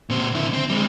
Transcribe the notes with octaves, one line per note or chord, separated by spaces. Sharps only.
A#2 C4
D3 E4
C4
G3 G#3